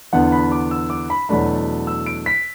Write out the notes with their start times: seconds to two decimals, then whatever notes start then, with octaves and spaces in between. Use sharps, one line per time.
0.13 E2 D3 B3 F#5
0.32 B5
0.52 D6
0.71 E6
0.90 D6
1.10 B5
1.29 E2 B2 F#3 A3 D4 B5
1.87 E6
2.06 D7
2.26 B6